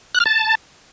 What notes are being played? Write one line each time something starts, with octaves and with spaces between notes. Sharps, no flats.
F#6
F6
A5